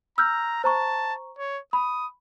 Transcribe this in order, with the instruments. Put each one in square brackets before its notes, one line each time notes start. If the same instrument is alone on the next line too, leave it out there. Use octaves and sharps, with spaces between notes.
[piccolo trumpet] A#5 [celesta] E6 F6 G6
[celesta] C5 A#5 C#6 [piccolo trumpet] A5
[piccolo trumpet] C#5
[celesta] B5 [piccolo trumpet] D#6